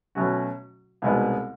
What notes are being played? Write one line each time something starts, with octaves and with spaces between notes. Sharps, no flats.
B2 F#3 A3 C#4 F#4
C2 B2 G#3 B3 D#4